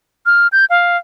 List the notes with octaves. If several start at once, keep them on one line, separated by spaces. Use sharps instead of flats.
F6
G6
F5